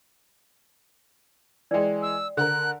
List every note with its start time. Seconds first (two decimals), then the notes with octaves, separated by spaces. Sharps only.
1.71 E3 G#3 D5 G5
2.02 E6
2.37 D3 A#4 F#6